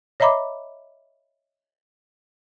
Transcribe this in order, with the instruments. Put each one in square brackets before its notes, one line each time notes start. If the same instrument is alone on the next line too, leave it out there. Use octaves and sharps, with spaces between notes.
[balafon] C#5 D#5 E5 A#5 B5 D6